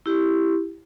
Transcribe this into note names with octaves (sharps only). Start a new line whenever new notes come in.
E4 G4